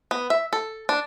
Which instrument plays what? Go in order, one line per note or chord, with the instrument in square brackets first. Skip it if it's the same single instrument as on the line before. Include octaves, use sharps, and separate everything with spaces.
[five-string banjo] B3
E5
A4
D4